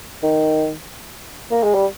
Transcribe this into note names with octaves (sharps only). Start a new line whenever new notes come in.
D#3
A#3
G#3
G3